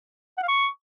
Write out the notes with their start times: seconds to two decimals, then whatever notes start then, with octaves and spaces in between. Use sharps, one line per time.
0.38 F#5
0.43 F5
0.48 C#6